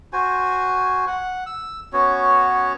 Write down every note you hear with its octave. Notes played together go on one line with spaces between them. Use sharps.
F#4 C5 G#5
F#5
E6
B3 C#4 F#4 C#5